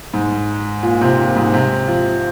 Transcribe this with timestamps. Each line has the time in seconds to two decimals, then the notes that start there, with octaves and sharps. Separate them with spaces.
0.14 G#2
0.83 A#2
1.01 C3
1.19 A#2
1.36 G#2
1.54 C3
1.88 F3